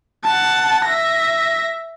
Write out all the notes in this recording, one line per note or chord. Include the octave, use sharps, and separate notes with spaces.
F#5 A5
E5 A#6